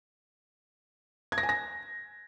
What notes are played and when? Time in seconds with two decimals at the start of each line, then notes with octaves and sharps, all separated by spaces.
1.32 G#6
1.38 A#6
1.43 G#5
1.49 A#6